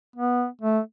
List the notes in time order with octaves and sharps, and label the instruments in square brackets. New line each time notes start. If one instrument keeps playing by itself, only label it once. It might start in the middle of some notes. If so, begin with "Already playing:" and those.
[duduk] B3
A3